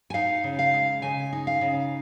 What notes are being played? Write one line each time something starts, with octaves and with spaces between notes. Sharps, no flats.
G#5
D#4 F5
C#3
F5
G#3
C#3 G#5
D#4
F5
C#3